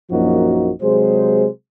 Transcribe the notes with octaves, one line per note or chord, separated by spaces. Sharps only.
A#1 F#2 F3 A#3 D#4 F#4
C3 F#3 G#3 G#4 C5